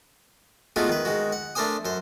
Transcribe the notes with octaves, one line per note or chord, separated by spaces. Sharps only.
G#3 A3 B3 D#4 F4 F#4
D#3 B4
D#3 G#3 F#4
F#5
A3 D4 A#4 C5 G#5 D#6
F#2 C5